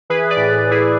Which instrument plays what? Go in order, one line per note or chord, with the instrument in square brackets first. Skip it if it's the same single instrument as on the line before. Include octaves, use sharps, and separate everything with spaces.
[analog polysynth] E3 G#4 B4
B4 D5
A2
A2
E4 G#4